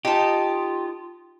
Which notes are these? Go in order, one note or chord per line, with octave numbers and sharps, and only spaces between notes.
D#4 F4 G4 A5